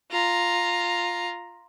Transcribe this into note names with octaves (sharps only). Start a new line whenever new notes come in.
F4 A#5